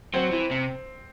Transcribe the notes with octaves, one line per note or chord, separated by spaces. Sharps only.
F#3 C4
E3
C3